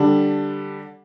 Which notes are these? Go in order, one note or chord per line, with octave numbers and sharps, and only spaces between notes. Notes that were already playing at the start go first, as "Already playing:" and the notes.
Already playing: D3 G3 D4